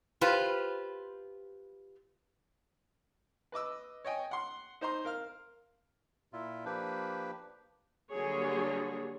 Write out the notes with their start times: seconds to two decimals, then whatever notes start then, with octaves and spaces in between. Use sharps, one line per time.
0.21 F4 G4 B4 C5
3.52 B4 D#5 D6 E6
4.05 C#5 D#5 G5 G#5
4.31 F#5 C6
4.81 D#4 C5 A#5 C6
5.05 A#4 F5 F6
6.33 A#2 E4 F4
6.65 F3 A#3 D4 G4 B4
8.11 D3 F#3 G3 A#3 G#4 C#5